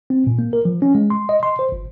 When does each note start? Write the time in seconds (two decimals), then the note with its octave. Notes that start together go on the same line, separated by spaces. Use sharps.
0.10 C4
0.27 A#2
0.39 A#3
0.53 A#4
0.65 F3
0.82 C#4
0.95 G#3
1.10 C6
1.29 D#5
1.43 C6
1.59 C5
1.72 G1